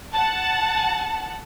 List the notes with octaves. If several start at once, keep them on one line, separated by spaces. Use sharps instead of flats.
F#5 A5